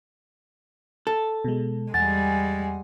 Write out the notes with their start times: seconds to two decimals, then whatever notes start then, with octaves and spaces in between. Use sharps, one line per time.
1.07 A4
1.45 B2 G#3
1.94 E2 G3 G#3 F#5 G#5 A6